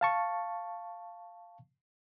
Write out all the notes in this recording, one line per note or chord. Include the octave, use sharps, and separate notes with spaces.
F5 A5 C#6